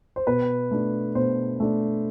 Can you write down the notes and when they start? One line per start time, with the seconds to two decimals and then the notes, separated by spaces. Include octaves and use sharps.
0.16 C5
0.27 B2 B4
0.71 A3 D4
1.15 B2 C5
1.60 A3 D4